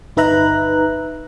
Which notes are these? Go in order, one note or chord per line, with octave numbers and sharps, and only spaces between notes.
G1 D#4 B4 E5 A#5 F#6